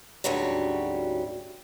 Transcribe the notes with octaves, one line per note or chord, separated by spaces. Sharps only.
D2 G#2 C#3 F#3 G3